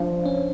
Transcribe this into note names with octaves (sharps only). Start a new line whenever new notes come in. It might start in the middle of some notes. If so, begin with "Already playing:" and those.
Already playing: F3 D4
C#4